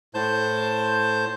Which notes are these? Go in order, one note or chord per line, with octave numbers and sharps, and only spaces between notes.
A2 C5 A5 G6